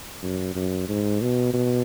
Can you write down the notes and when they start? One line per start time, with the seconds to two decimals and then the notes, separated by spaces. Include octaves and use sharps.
0.23 F#2
0.56 F#2
0.89 G#2
1.22 B2
1.54 B2